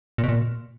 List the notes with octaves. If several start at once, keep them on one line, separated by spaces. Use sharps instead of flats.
A#2
B2
A#2